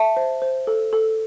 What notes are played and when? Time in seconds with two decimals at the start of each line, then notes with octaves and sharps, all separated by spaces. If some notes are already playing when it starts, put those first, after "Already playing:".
Already playing: E5 A5
0.17 C5
0.42 C5
0.67 A4
0.93 A4